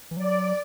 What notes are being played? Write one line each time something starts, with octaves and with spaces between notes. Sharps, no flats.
E3
F#3 D5